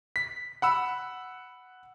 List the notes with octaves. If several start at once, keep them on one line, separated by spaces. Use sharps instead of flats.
B6
F#5 B5 E6